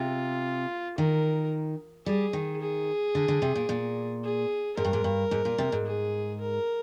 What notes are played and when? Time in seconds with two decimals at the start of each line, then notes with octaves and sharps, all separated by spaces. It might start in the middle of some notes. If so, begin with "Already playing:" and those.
Already playing: C3 F4
0.98 D#3 A#4
2.06 G3 G#4
2.33 D#3
2.61 G#4
3.15 D3
3.28 D3
3.42 C3
3.55 A#2
3.69 A#2
4.23 G#4
4.77 G#2 A#4
4.85 G2
4.93 G#2
5.04 G2
5.31 G#2
5.45 A#2
5.58 C3
5.72 G#2
5.86 G#4
6.40 A#4